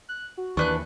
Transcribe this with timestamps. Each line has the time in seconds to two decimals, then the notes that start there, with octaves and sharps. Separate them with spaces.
0.09 F#6
0.37 F#4
0.57 D#2 E3 D4 B4 C#6 F#6